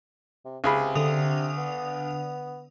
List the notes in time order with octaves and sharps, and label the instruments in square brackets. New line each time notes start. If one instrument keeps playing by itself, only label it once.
[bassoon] C3
[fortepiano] C#2 G#4 B5 [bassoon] C3
[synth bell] D3 D#6 F7
[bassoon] B3